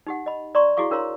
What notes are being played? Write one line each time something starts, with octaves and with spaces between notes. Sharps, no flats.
D#4 G4 F#5
D#5 B5
D5 A#5 C6 C#6
E4 F#4 G#4 F5 C#6
D4 A#4 C#5 F5 A#5 C6